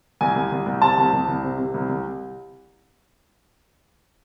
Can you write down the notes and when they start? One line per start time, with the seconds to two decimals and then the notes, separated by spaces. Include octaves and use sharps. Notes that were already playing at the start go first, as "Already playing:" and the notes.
0.21 C2 G#5
0.35 C2
0.52 C2
0.66 C2
0.82 C3 A5
0.98 C2
1.13 C2
1.28 C2
1.43 C3
1.58 C3
1.74 C2
1.89 C2